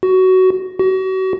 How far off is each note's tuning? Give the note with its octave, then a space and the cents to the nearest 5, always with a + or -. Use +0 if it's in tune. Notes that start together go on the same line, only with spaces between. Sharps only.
F#4 +15
F#4 +35